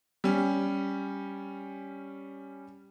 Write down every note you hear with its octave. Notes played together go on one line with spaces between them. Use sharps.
G3 C#4